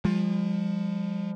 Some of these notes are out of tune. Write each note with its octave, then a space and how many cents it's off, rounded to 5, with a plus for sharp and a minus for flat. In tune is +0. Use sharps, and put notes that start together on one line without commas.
F3 +15 G#3 -45